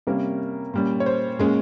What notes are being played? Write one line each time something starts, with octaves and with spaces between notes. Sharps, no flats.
C3 G3 A#3 C#4 A#4
A#2 G3 C#4
C#5
C5
A#2 G#3 C#4 G#4